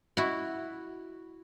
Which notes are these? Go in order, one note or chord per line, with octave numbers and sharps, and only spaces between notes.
E4 F#4